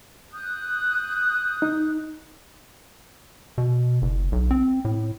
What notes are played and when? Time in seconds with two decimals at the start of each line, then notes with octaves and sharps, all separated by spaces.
0.32 D#6 F#6 G6
1.62 D#4
3.58 B2
4.02 F#1
4.32 B1
4.51 C4
4.85 A2